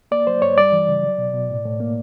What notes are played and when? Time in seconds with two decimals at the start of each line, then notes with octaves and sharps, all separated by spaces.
0.11 A#3 D5
0.27 F#3 C5
0.42 G2 C#5
0.57 G3 D5
0.72 E3
0.88 C#3
1.04 F#3
1.18 B2
1.34 B2
1.50 A2
1.65 A2
1.80 A#3